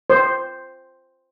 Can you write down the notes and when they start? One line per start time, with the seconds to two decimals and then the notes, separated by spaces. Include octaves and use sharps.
0.10 C5